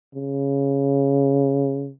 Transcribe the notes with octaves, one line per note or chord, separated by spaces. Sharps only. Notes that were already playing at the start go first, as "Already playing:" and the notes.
C#3